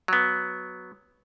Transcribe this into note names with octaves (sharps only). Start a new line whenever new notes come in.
F#3 B3